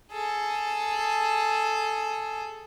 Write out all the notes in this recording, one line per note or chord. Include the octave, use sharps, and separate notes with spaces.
G#4 A4